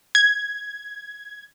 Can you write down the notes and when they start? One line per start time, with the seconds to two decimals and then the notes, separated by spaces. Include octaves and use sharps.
0.15 G#6